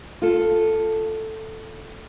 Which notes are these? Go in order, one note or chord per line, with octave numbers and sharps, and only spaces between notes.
F4 A4